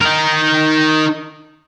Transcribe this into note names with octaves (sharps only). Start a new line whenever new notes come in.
D#4 A#4